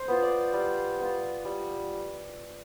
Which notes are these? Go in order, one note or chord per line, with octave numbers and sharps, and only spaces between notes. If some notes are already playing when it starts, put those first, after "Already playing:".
Already playing: C5
B3 F4
D5
G3
B3 F4
G3